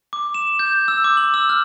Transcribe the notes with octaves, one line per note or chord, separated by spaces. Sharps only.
D6
E7
G6
E6
D6
F#7
E6
F6